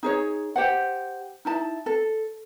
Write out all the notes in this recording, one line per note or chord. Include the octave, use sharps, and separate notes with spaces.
D#4 G#4 C#5
G4 C5 F#5
D#4 E4 A5
A4